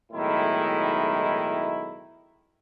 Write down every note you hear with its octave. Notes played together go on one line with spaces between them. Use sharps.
B1 A2 D#3 G#3 E4